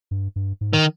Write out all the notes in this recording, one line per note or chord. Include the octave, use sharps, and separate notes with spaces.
G2
G2
G#2
D#3